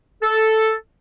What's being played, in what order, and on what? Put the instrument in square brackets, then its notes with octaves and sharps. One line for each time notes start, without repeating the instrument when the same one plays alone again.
[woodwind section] A4